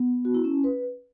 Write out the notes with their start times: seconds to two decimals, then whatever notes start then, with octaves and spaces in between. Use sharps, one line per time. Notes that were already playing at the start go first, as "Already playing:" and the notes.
Already playing: B3
0.25 F#4
0.34 E4
0.44 C#4
0.64 B4